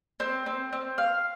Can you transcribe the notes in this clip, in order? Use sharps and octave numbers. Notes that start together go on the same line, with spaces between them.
C4
C4
C4
F5